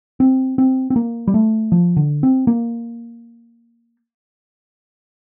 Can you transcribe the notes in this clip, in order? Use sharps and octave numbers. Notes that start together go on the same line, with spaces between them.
C4
C4
C4
A#3
G3
A3
F3
D3
C4
A#3